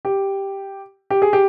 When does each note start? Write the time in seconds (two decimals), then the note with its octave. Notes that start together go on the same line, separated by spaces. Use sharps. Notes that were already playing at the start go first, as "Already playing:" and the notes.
0.05 G4
1.11 G4
1.22 G#4
1.33 G4